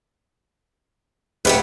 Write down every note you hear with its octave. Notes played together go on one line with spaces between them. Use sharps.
D1 G4 B4 D5 F#5